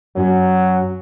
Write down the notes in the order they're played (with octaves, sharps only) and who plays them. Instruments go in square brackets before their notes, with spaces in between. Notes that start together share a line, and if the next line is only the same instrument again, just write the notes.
[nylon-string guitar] F#2 C#4 F#4 [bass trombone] F#3